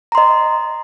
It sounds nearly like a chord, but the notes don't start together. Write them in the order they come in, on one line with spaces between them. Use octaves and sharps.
A#5 C6 D#5